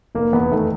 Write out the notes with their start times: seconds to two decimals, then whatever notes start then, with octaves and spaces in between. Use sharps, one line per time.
0.15 F1 A#3
0.33 E2 B3
0.51 D#3 A3